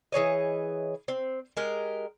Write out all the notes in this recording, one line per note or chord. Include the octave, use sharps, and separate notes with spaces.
E3 G#4 C#5 D#5
C4
G#3 G4 A#4